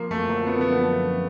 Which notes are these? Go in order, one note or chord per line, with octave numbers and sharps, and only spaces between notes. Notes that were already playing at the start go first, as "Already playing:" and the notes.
Already playing: F3 A#3
F#2 A3
D3 A#3
A3 B3
B3